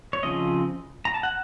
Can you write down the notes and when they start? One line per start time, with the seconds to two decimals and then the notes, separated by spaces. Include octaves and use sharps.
0.13 C#5
0.23 C#3 F3 C4 D#5
1.05 A#5
1.14 A5
1.23 F#5